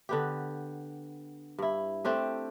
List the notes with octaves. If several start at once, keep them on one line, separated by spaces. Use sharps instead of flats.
D3 B3 G4
G2 E4
A3 C4 D4 G4